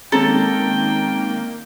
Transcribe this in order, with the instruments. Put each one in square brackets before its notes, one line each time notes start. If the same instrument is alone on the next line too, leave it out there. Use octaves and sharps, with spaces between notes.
[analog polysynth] D#3 A#3 [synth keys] G#3 C4 C#4 [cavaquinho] A4 A#5 [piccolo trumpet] G5